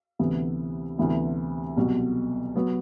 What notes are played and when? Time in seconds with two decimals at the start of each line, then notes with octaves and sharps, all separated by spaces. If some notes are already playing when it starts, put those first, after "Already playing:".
0.19 D2 C3 E3 B3
0.98 D2 C3 E3 B3 E4
1.77 C2 B2 F#3
2.56 F#3 B3